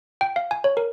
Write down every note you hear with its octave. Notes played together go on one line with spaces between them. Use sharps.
G5
F5
G#5
C#5
A#4